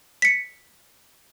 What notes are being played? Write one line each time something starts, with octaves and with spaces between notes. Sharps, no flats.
B6 C#7